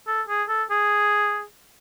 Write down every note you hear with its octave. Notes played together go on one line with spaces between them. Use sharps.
A4
G#4
A4
G#4